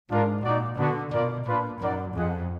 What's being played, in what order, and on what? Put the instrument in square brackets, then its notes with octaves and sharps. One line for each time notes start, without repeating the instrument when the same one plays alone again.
[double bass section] G#2 [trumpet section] D4 F4 A#4
[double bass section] A#2 [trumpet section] D#4 F#4 D5
[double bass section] D3 [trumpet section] B3 D4 F#4 B4 D5
[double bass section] B2 [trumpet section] F4 A#4 D5
[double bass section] A#2 [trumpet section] D4 F4 B4
[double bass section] F#2 [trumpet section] D#4 A#4 D5 F#5
[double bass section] F2 [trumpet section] F4 G#4 D#5 F#5